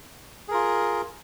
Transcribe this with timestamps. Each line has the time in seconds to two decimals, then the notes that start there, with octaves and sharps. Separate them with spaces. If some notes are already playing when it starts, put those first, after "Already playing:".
0.48 G#4
0.51 A#4
0.54 F4